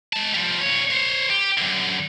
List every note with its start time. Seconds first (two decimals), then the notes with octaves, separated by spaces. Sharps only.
0.13 G#3 A5
0.34 F3 G3
0.61 A#2 C#5
0.90 C5 C#5
1.30 G4
1.58 F#2 D3